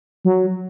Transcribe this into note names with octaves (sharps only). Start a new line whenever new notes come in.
F#3